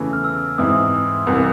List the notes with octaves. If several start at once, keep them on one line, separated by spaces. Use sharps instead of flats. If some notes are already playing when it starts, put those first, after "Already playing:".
Already playing: E2 C#3 E3 A3
F6
E6
G#2 E3 G#3 C4 E4 D#6
C2 C3 E3